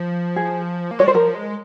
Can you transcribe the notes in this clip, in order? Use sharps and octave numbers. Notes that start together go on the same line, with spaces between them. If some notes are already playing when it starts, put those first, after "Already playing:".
Already playing: F3
G#4
A#3
G#3 C#5
G3 C5
F3 A#4
G#3